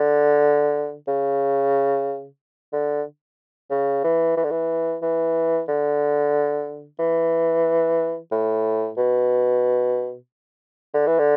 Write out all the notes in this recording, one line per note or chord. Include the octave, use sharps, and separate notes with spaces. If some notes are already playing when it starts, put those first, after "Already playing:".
Already playing: D3
C#3
D3
C#3
E3
E3
D3
E3
E3
D3
E3
A2
B2
D3
E3
D3